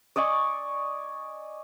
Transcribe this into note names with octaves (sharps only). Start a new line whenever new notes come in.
D5 D#5 G#5 C#6